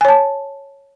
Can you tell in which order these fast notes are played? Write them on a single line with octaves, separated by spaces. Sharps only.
G#5 C#5 A5